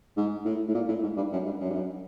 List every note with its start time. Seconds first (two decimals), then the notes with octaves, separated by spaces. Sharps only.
0.17 G#2
0.45 A2
0.68 A2
0.75 A#2
0.89 A2
1.02 G#2
1.17 G2
1.32 F#2
1.45 G2
1.61 F#2
1.70 G2
1.74 F#2